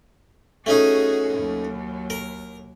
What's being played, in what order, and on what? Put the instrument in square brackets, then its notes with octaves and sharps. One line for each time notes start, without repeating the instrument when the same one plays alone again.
[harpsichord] A3 C#4 D#4 [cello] F#4 G#4
[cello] D#2 F#3
[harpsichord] A#4